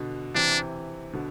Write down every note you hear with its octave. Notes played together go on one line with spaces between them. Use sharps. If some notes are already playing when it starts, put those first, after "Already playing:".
Already playing: B2 D3
C3 E3 D4
B2 D3